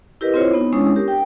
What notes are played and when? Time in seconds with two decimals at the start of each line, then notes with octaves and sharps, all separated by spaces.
0.21 E4 G4 A#4 B4 D#5
0.34 C4 E4 F4 C5 C#5
0.53 B3 D#4
0.73 G#3 C#4 D4 E4 C#5 D#6
0.96 G4 A#4
1.08 G5